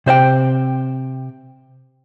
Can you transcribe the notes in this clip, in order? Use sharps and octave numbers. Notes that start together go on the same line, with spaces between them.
C3 C5 D#5 G5